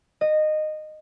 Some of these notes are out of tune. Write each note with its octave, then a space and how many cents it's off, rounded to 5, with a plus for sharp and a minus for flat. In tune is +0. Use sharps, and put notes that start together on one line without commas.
D#5 -15